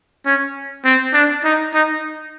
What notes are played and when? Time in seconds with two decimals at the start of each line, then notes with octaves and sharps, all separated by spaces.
0.26 C#4
0.85 C4
1.13 D4
1.44 D#4
1.74 D#4